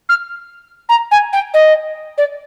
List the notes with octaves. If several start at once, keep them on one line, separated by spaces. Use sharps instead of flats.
F6
A#5
G#5
G5
D#5
D5